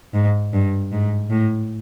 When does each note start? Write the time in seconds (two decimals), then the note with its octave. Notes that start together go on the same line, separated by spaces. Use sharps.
0.13 G#2
0.53 G2
0.92 G#2
1.30 A2